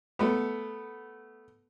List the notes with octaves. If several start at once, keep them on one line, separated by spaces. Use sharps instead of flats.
A3 B3